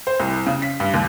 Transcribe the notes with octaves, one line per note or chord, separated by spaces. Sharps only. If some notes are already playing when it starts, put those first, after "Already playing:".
C5
C2
C#3
B6
G2
D#2